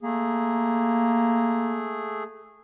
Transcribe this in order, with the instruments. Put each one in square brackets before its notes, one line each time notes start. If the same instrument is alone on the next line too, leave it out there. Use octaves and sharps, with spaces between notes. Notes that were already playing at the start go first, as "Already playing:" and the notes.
[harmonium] A3 G#4 [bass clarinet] A#3